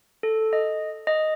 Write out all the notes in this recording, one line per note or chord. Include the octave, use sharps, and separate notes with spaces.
A4
D#5
D#5